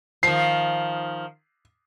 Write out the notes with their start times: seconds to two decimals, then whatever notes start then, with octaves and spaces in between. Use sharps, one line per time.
0.23 D#3 F3 C7